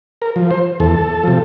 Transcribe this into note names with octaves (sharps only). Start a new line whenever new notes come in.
A#4
F3
C5
E2 A4
C3 F3